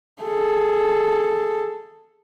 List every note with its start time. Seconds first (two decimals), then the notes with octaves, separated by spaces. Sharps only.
0.23 G#4 A4